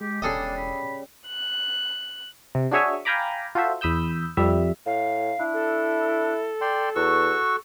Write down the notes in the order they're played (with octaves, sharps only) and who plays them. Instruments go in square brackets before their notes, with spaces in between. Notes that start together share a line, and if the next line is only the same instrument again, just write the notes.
[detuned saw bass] G#3 [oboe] G4
[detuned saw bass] E1 [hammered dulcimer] C#3 G3 [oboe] D4 [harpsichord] G#4 A4 D#5
[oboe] B5
[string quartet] F#6
[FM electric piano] C3
D4 F#4 G#4 C#5 E5 G#5
F5 G5 G#5 A#5 B5 D6
F4 F#4 A4 C5 E5
E2 B5 D#6 E6 G6
F2 G3 E5
[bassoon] A2 [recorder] F5
[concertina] D4 [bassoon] E4
[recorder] A4
[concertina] D5 G5 C6
[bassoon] E2 [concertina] F#4 C#6 E6